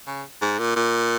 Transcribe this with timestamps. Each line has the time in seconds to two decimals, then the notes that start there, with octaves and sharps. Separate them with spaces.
0.07 C#3
0.42 G#2
0.59 A#2
0.76 A#2